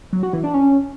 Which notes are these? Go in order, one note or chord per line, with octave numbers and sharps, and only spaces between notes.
F#3
F#4
E3
D4
C#4